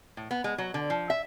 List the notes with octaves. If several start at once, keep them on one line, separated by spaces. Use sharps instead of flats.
A2
B3
G#3
F#3
D3
F3
E5